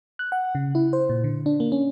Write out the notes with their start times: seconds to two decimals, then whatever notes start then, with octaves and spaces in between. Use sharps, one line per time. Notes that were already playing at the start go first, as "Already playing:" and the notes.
0.19 F#6
0.32 F#5
0.55 C#3
0.75 E4
0.93 C5
1.09 A#2
1.24 D3
1.46 D4
1.60 A#3
1.72 C#4